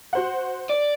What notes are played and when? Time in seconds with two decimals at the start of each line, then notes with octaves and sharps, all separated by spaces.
0.13 F#4 C5 F#5
0.69 D5